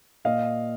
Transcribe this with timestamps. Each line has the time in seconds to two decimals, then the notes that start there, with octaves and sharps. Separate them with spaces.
0.25 A#2 D#5 F5